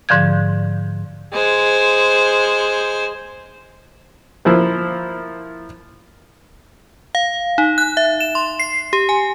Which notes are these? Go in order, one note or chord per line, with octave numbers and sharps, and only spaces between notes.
G#2 D3 F3 G6 G#6
G#3 C5
F3 A#3 E4 C5
F5
D#4
F#6
E5
E7
C6
C7
G4
G#5